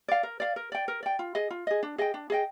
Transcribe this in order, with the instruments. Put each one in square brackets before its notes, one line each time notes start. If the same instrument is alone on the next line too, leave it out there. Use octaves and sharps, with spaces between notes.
[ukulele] D5 F5
A#4
D5 F5
A#4
D5 G5
A#4
D5 G5
F4
G#4 D#5
F4
G#4 D#5
D4
G#4 D#5 G5
D4
G#4 D#5 G5